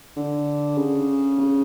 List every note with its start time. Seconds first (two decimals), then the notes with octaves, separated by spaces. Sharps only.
0.17 D3
0.78 C#3
1.39 C#3